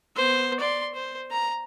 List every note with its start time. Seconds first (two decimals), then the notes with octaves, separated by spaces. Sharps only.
0.16 B3 C5
0.60 D5 C6
0.94 C5
1.31 A#5